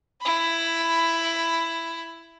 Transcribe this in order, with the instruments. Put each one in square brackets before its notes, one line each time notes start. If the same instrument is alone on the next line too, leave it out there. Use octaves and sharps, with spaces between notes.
[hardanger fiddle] E4 B5